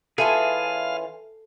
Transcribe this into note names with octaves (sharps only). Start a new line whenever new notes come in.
E3 C#4 F4 G#4 A4 F5 G#5